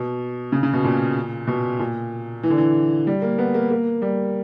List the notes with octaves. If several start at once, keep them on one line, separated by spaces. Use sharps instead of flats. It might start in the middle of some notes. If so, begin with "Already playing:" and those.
Already playing: B2
C#3
C#3
B2
A#2
B2
A#2
E3
D3
E3
G3
A#3
B3
A#3
A#3
G3